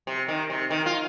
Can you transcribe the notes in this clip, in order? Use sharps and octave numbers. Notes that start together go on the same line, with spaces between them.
C3
D#3
C3
D#3
F4